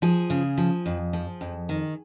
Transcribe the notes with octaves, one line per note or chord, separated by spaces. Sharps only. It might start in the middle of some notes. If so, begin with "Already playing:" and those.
F3 G#4
C#3
F3
F2
F3
F2
D#3